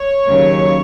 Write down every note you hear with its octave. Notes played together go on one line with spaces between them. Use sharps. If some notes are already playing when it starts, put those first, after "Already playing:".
Already playing: C#5
D#2 C#3 F#3